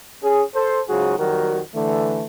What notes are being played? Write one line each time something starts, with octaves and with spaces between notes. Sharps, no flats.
C#4 G#4
A4 C5
G#2 C#3 F#3 F4 F#4 G#4
F2 D#3 F#3 G3 F#4 A#4
D3 E3 A3